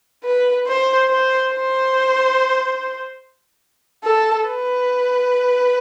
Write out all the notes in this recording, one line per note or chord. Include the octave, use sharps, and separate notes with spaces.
B4
C5
C5
C5
A4
B4